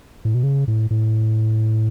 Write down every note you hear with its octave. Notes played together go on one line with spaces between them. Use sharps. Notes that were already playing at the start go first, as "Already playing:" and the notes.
A2
B2
C#3
A2
A2